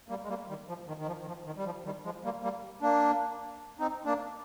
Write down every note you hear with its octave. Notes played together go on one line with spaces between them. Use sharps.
G3 A#3
G#3
G3 A#3
D#3 G3
F3
D#3
D#3
F3
D#3
F3
D#3
G3
F3
D#3 G3
F3 G#3
G3 A#3
G3 A#3
A#3 D4
C4 D#4
A#3 D4